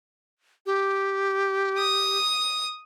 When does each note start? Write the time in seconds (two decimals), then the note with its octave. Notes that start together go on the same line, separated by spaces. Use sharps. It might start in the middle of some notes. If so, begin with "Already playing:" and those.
0.66 G4
1.78 D#6